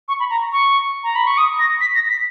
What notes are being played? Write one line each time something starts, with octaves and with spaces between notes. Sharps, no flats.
C#6
B5
A#5
C#6
A#5
B5
C#6
D#6
A#6
B6
A#6
B6